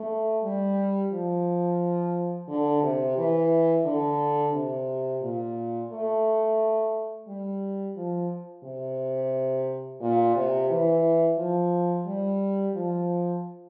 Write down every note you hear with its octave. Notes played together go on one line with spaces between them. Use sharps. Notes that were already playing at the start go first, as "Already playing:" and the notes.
Already playing: A3
G3
F3
D3
C3
E3
D3
C3
A#2
A3
G3
F3
C3
A#2
C3
E3
F3
G3
F3